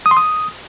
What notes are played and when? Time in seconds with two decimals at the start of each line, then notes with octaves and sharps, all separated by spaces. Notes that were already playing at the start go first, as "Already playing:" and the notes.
0.06 D#6
0.11 C6
0.17 D#6